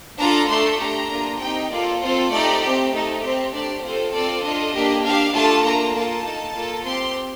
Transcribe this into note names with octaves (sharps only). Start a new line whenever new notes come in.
D4 F4 A4 A#5
A3 D4 A4 C6
D4 G4 A#5
A#3 D4 F4
C4 D#4 G4 G5
A#3 F4 A4 D5
C4 F4 A4 C5
A3 D#4 G4 D5
C4 G4
A3 D#4 A4
C4 G4
A3 D4 G4 D5
C4 F4 A4 C5
C4 F4 A4 D5
D4 F4 A4 D#5
A#3 D4 G4
D4 G4 F5
A3 D4 F4 A4 A5
A#3 D4 F4 A#5
A#3 F4 A4 A5
A#3 D#4 A4
A#3 F4 A4
C4 G4 C6